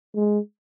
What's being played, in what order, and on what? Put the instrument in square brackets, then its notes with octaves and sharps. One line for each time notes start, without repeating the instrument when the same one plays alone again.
[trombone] G#3